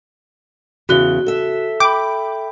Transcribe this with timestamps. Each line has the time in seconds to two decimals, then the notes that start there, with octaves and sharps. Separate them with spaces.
0.89 E2 C#3 F#4 F#6 G7
1.26 A4 E5
1.80 G5 B5 D6 G6